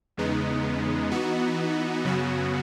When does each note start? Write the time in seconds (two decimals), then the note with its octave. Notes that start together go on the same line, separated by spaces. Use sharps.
0.17 E2 C#3 G#3 B3 D#4
1.11 E3 B3 D#4 F#4
2.05 F#2 C#3 F#3 B3 F#4